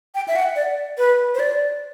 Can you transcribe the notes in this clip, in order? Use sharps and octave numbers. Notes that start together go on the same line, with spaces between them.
G5
E5
F#5
D5
B4
C5
D5